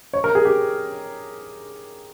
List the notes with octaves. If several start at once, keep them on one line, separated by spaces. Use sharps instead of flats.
C#5
A#4
G#4
G4